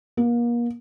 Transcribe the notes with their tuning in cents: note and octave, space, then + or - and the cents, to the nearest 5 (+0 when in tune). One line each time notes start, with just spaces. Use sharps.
A#3 +35